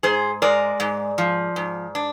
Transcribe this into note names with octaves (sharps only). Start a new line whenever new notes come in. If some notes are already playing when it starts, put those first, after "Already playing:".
G#2 G#4 C5
G#3 A#4 D5
G#2
F3
G#2
D4